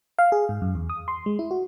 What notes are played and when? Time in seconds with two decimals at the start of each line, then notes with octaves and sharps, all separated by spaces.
0.19 F5
0.32 G#4
0.49 G#2
0.62 F#2
0.75 E2
0.90 D#6
1.08 C6
1.26 G#3
1.39 E4
1.51 F#4